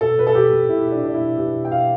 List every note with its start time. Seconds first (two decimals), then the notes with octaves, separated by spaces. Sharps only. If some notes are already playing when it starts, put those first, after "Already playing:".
0.01 B2 A4
0.18 B2 B4
0.27 A4
0.35 B2 G4
0.52 B2
0.68 B2 E4
0.86 B2
0.92 D4
1.03 B2 D4
1.14 E4
1.20 B2
1.37 B2 G4
1.54 B2
1.65 G5
1.71 B2 F5